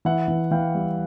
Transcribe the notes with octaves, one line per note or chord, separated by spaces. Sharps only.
E3 E5 F#5
E3
E3 F5 G5
G3